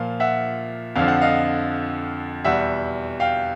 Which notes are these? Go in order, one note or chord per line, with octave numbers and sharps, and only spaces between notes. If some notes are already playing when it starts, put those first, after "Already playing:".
Already playing: A#2 F3 F5
E5 F#5
F2 D3 F3 F5
F#5
D#5 F5
E2 B2 G3 E5 F#5
F5 G5